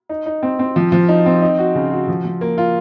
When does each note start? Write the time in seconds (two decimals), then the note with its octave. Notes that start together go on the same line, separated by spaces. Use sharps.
0.09 D#4
0.26 D#4
0.43 C4
0.59 C4
0.76 F3
0.92 F3
1.09 D#4
1.26 C4
1.42 D#4
1.58 F#4
1.75 C#3
1.92 F#4
2.08 F3
2.25 F3
2.41 A#3
2.58 F4